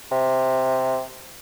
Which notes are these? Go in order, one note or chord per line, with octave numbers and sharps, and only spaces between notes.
C3